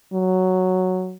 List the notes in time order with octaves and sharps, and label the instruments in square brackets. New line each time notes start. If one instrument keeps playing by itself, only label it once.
[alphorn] F#3